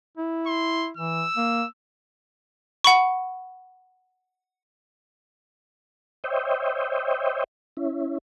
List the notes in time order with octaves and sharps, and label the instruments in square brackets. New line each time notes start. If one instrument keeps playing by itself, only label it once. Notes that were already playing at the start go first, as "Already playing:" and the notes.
[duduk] E4
[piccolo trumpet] C6
[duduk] E3 [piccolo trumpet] E6
[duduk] A#3
[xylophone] F#5 B5 C#6
[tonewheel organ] C5 C#5 D#5 E5 G5
C#4 E4